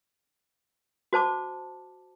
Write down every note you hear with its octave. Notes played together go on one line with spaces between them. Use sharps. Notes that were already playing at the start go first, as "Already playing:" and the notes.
F#4 C5 A5 D6